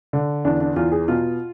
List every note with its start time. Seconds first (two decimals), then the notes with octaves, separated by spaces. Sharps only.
0.13 D3
0.45 E2 D4
0.60 D4
0.76 E2 F4
0.92 G#4
1.08 B2 F4